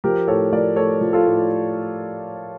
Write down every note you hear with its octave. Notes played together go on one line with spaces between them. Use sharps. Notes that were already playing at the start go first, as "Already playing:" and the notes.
F3 G4 A#4
A2 A4 C#5
F3 A#4 D5
A2 A4 C#5
F3
F4 A4
A2